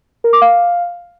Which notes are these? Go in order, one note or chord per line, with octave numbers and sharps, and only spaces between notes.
A#4
D6
F5